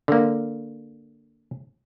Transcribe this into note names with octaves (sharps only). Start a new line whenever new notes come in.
D3 A#3